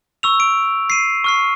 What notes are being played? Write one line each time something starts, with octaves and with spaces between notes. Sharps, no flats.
C#6 E6 F7
D7
C7 D#7
C#6 F6 C7